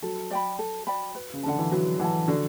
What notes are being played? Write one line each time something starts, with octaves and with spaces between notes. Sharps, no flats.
F#3 A4
D5 G5 B5
A4
D5 G5 B5
B4
C#3
D3 F#5 A5
E3
F#3 B4
E3 F#5 A5
D3 F#4